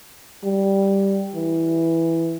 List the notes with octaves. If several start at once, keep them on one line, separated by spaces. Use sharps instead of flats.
G3
E3